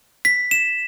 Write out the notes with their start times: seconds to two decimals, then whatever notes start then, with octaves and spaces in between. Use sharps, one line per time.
0.25 B6
0.51 E7